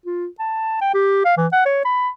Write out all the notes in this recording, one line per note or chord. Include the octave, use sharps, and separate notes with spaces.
F4
A5
G5
G4
F5
E3
F#5
C#5
B5